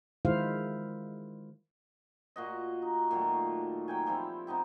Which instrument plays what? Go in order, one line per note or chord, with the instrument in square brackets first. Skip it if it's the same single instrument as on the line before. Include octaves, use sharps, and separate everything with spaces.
[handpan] D#3 G#3 E4 F4 C5 F5
[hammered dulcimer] A#2 F#4 D#5
D#4
A#2 D#3 F#3 A3
F#3 G5 G#5
F3 G3 C4 E4
C3 B3 D#4 G4